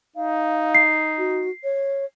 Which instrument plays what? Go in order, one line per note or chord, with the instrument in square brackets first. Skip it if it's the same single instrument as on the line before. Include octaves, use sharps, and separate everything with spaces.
[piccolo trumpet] D#4 [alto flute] F5
[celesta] C7
[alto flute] F#4
C#5